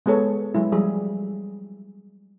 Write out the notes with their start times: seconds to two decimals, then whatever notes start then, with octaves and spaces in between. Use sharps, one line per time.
0.06 G#3 B3 G#4 A4 C#5
0.54 F#3 G#3 E4
0.72 F3 G3 G#4